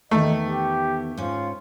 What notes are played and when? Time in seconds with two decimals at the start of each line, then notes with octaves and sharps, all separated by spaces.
0.11 E2 D#3 A3 B3 D#5
0.48 G4
1.17 G#2 C#4 F4